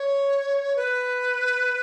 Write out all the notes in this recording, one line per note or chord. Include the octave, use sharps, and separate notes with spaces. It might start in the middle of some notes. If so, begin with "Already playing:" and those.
Already playing: C#5
B4